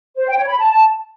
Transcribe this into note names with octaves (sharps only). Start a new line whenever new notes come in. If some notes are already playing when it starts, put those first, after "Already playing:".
C5
G5
C#5
B5
A5